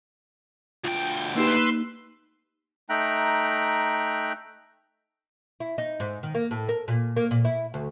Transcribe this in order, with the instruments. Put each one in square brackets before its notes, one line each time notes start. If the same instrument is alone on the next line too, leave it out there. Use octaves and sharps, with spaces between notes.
[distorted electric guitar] D2 G5 [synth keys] F4
[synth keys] A#3 D#4 G4 [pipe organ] B4 C6 E6
[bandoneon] A3 D#4 E5 G5 A#5 F#6
[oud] E4
D#4
G#2
D#3
A#3
A2
A#4
A#2
A#3
A#2
E4
D2